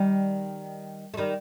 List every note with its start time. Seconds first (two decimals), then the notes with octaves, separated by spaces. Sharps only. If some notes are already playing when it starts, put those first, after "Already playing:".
Already playing: D#3 G3
1.14 A3
1.17 D#3 G3